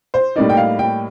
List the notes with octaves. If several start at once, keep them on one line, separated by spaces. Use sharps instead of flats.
C5
A2 G3 A#3 D#4 D5
G5
F5
G5